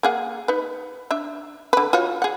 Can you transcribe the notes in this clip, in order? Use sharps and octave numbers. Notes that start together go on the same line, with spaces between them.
A#3 G#4 F#5
D#4 B4
D4 E5
D3 B4
F4 F#4 C#5
G#4 F#5